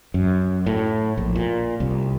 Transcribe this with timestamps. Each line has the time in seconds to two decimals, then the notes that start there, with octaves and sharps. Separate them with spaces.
0.14 F#2
0.66 A2
1.17 A#1
1.35 A#2
1.80 C2